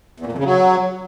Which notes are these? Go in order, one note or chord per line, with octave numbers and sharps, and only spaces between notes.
E2
A#2
F2
C#3
F#3